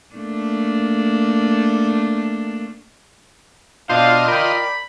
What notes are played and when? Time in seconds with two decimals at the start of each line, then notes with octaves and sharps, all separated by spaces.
0.15 A3 A#3 D4
3.90 B2 D4 F4 C5 D#5 F5
4.28 A#4 D5 G5 B5